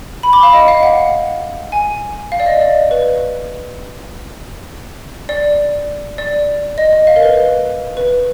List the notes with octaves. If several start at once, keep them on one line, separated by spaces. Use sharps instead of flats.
B5
D6
F5
D#5
F5
F#5
G#5
F5
D5
D#5
D5
B4
D5
D5
D#5
D#5
F5
A#4
B4
B4
B4